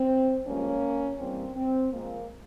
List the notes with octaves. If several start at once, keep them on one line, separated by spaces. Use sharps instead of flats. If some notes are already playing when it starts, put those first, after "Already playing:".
Already playing: C4
G2 F3 G#3 A#3 C#4
G2 E3 G3 A#3 C4
C4
A#2 F3 G#3 A#3